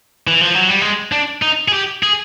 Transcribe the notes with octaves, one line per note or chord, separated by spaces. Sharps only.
E3
F3
F#3
G3
G#3
D4
D#4
G#4
G4
G#4